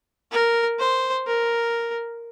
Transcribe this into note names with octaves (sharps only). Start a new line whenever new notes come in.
A#4
C5
A#4